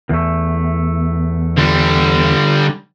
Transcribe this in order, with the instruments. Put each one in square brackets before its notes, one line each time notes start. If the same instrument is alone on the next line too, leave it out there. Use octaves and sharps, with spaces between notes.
[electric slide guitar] E2 A3
[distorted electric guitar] D3 G3